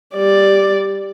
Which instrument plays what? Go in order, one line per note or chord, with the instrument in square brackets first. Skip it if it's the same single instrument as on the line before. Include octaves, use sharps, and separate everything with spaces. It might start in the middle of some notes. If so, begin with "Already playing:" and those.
[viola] G3 D5